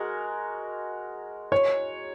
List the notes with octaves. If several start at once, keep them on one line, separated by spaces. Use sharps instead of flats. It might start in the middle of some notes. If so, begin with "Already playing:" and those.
Already playing: G#3 F#4 A#4
C#5